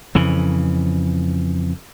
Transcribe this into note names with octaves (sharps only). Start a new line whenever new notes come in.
F2 C#3 E3